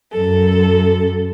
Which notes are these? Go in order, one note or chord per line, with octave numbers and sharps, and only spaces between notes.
F#2 A4